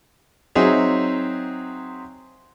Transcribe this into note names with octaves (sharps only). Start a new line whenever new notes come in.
F#3 C4 D#4 G#4 E5